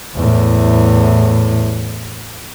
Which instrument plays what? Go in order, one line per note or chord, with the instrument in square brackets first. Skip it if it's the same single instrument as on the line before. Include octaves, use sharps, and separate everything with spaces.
[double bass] E2 A2